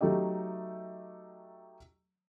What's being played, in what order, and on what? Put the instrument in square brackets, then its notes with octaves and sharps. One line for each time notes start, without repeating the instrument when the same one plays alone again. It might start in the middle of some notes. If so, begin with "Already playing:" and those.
[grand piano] F#3 A3 D#4 G4 D#5